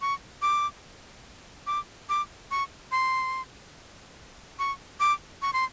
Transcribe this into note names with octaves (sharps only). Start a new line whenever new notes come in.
C#6
D6
D6
D6
C#6
C6
C#6
D6
C#6
C6